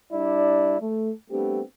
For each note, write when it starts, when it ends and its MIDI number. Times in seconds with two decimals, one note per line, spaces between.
0.13 0.78 55
0.13 0.78 62
0.13 0.78 64
0.13 0.78 74
0.81 1.11 57
1.30 1.61 55
1.30 1.61 57
1.30 1.61 59
1.30 1.61 60
1.30 1.61 62
1.30 1.61 67